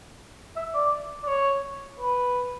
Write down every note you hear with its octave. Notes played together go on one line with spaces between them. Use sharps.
E5
D5
D5
C#5
B4